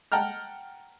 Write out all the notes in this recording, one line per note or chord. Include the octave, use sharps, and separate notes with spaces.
F#5 G5 A5 A#5 F6